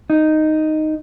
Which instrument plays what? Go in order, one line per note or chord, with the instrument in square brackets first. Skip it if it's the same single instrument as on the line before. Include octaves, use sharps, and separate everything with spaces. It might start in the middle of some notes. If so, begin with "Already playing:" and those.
[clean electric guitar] D#4